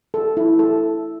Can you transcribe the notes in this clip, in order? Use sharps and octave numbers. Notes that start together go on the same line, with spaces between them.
A4
E4
A4